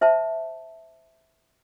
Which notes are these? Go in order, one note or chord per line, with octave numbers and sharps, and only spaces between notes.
C5 E5 A5